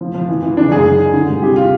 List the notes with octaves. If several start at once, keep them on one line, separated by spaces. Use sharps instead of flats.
F3
F3
E3
E3
C#3 D4
F#2 G#4
D#3
D#3
D3
G2
C3 G4
F4